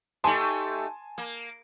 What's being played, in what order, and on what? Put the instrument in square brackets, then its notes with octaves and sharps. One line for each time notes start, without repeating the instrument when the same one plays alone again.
[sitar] A3 D#4 G4 [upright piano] G#5 A5 C6
[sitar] A#3